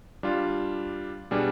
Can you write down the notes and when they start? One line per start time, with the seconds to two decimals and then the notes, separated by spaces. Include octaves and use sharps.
0.23 G3 D4 F4
1.31 B2 G3 D4 G#4